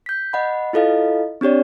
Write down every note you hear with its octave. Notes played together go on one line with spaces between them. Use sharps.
G6 B6
D#5 F#5 B5
E4 F4 A4 D#5 F5
C4 D4 G4 C#5 D5